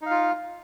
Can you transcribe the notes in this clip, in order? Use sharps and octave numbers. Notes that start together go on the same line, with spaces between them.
D#4 F4 F5